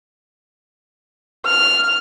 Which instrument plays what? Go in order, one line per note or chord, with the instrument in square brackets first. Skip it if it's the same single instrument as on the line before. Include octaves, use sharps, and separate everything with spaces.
[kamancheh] F6